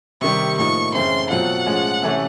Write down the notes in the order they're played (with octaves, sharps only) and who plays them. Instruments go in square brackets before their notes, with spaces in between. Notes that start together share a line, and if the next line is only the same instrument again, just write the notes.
[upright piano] C3 D#3 G3 [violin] C#6
[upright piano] A2 F3 A#3 D#4 [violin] C#6
[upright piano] F#2 C#3 E3 A3 C4 [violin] C6
[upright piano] B2 F#3 A3 C4 F4 [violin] F#5
[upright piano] A2 F3 G#3 C#4 F4
C3 E3 A3 C#4